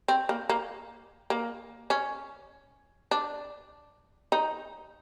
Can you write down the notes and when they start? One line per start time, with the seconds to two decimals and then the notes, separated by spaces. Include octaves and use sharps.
0.08 C4
0.29 A#3
0.49 A#3
1.30 A#3
1.90 C#4
3.11 D4
4.32 D#4